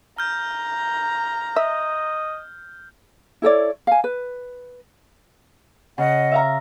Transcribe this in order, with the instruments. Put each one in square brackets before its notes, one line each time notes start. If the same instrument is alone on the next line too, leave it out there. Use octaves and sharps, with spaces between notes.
[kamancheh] A#5 [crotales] F6 G6
[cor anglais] D#5 [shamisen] E5
[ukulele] E4 A4 C#5 D5
F5 G#5
B4
[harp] C#3 [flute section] D#5 F#5
[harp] E5 F5 A#5